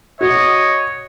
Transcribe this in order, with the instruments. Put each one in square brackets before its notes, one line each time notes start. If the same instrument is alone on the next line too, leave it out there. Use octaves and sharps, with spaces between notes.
[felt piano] F#4 [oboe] C#5 [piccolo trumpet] D#5